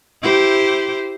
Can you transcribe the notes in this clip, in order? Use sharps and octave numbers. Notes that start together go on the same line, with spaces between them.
E4 G4 C5